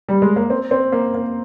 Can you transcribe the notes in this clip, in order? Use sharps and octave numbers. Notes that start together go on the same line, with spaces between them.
G3
G#3
A#3
C4
C4
A#3
A#3